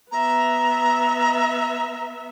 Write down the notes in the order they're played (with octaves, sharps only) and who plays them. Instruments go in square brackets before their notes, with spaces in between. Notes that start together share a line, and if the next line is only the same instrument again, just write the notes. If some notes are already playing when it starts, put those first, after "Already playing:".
[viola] B3 E5 [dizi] A#5